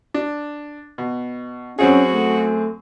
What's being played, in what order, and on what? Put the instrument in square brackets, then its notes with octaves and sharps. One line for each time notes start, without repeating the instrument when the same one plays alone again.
[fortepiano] D4
B2
[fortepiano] F#2 C4 G#4 [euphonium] C#4 [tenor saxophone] F#4
[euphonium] A3